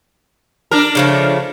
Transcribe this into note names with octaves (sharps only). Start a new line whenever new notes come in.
D4 A#4
C#3 F3 A3